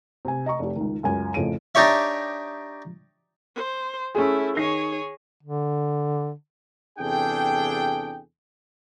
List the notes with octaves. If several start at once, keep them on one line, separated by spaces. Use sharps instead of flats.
C3 G#5
D#5 A#5 C#6
F1 G4
C#2 D#3
C#2 F#2 G#5
A1 F2 C#3 D7 D#7
D4 D#4 G4 C#5 E5
C5
A3 C#4 E4 G#4
D#3 G#4 C#5 A#6 C7
D3
E2 C3 D4 G#4 A4 G5